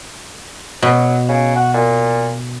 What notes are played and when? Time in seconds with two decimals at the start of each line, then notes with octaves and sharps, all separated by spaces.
0.82 B2 F#3
1.29 C#3
1.56 F#4
1.74 A#2